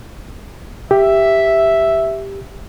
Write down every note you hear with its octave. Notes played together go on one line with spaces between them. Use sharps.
G4 E5